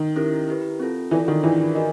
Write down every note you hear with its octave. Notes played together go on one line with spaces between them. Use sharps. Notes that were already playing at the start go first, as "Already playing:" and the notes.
Already playing: D#3
C#4 E4 G4 A#4
E4 G4 B4
C4 F4 A4
E3 F4 A4 D5
D#3
E3 D4 F4 G#4 B4 D5
F#4 A#4 D#5